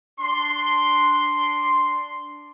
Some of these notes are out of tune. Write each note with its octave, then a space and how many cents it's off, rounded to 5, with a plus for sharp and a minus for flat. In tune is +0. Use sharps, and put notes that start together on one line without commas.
D4 +0 C6 +0